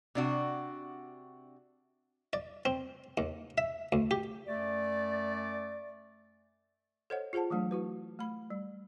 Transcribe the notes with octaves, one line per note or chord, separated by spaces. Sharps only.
C3 D4 F#4
D5
C4
D#2
E5
D2
G4
F#2 A3 D5
A4 C5 C#5 D#5 F#5
F4 G#4 C5 F#5 A5
E3 F#3 A3 D4
E4 F#4 B4
A3 B5
G3